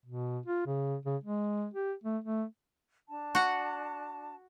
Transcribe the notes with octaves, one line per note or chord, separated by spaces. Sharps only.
B2
F4
C#3
C#3
G#3
G4
A3
A3
D4 A5
F#4 F#5